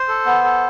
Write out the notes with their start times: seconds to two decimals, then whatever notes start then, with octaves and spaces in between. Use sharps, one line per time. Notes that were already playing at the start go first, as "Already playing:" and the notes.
Already playing: C5
0.08 A4
0.26 B3
0.44 A4